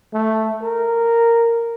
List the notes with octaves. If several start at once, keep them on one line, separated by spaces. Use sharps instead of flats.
A3
A#4